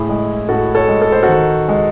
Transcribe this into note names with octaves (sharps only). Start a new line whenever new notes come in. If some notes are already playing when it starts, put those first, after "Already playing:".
Already playing: A2 E4 G#4
G#3
A2 F#4 A4
A4 C#5
G#3
A4
C5
F#4 A4
D#3
G#3